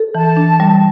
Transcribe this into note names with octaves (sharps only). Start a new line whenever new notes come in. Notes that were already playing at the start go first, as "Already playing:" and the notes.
Already playing: A4
E3 A5
D4
G3